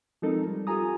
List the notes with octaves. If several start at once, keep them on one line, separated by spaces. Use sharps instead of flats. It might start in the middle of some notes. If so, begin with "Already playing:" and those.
F3 G#3 C4 D#4 A4 A#4
G3
F4 G4 A4 G#5 A#5 D#6